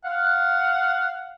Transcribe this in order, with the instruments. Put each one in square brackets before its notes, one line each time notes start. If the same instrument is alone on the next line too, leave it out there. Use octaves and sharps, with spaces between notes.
[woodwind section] F5 F#5